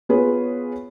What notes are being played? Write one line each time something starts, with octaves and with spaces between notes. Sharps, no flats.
B3 F4 G#4 B4 C#5